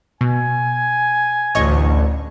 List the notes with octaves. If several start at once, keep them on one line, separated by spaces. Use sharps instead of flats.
B2 G#5
A1 D2 C#5 D#5 C#6